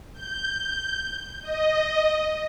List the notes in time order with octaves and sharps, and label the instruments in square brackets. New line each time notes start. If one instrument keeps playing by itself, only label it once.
[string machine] G6
D#5